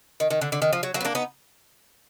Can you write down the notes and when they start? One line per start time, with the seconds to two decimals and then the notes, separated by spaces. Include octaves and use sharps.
0.20 D#3
0.30 D#3
0.41 D3
0.52 D3
0.62 D#3
0.73 F3
0.83 F#3
0.94 F#3 A#3
1.01 B3
1.05 A#3 D4
1.15 B3 D#4